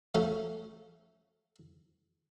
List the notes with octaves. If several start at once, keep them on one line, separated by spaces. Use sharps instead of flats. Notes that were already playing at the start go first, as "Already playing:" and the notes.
F3 A3 C#4 A4